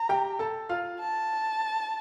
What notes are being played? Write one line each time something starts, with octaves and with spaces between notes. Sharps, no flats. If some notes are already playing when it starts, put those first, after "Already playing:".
Already playing: A#5
G4 G5
A4 A5
F4 F5
A5